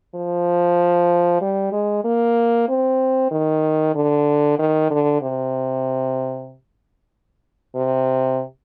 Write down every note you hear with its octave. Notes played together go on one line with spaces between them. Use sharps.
F3
G3
G#3
A#3
C4
D#3
D3
D#3
D3
C3
C3